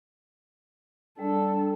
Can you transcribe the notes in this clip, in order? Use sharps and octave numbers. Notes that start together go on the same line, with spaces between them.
G3 D4 A4